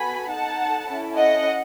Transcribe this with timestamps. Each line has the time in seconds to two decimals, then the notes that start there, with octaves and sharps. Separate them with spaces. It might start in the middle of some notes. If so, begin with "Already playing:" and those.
Already playing: B3 F#4 A4 G#5 B5
0.30 D#4 A4 F#5 A5
0.88 C#4 E4 A4
1.17 D#5 F#5